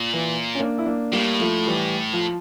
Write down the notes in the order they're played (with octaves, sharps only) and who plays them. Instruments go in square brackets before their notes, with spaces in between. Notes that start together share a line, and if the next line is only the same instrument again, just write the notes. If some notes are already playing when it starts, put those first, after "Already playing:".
Already playing: [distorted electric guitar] A#2
[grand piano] E3
C#4
A#3 D4
E4
A#3 D4
[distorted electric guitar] A2 [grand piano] G3 A#3
[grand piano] F3 A3
E3 G3
F3